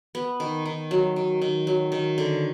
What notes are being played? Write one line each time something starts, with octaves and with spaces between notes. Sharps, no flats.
B3
D#3
D#3
F#3
D#3
D#3
F#3
D#3
D3